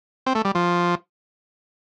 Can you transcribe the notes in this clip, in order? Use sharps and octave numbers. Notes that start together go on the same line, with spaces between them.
C4
A3
G3
F3